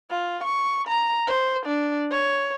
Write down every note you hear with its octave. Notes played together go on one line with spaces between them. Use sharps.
F4
C#6
A#5
C5
D4
C#5